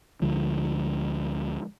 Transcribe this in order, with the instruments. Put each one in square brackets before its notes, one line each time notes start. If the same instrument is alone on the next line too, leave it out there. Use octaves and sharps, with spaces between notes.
[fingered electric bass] D2 D3 F3 G#3